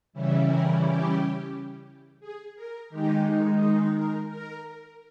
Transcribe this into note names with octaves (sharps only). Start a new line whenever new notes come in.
C#3 E3 G3 C#4 E4
A#4
G4
G#4
A#4
D#3 G#3 D#4 G4
G#4
A#4
A#4